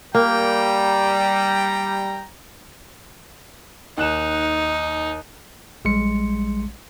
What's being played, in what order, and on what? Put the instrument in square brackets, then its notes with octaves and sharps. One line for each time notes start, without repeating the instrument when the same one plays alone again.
[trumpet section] G3 [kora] A#3 [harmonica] G5 A#5
[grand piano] D#2 F#6 E7 [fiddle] D#4
[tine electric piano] A#1 G3 G#3 C6 C#7